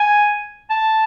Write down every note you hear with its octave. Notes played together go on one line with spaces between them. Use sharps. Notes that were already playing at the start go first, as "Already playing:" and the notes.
Already playing: G#5
A5